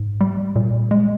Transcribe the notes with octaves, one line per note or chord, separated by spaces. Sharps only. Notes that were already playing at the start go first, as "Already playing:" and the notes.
Already playing: G#2
G3
A#2
G#3